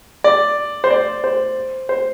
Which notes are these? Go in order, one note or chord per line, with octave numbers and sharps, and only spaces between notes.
D5
C5
D5
C5
C5